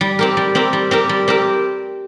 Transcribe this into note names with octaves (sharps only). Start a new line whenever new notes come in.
G3
C4 G4 A#4
G3
C4 G4 A#4
G3
C4 G4 A#4
G3
C4 G4 A#4